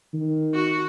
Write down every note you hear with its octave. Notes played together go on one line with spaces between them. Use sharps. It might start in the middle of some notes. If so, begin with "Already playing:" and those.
D#3
F#4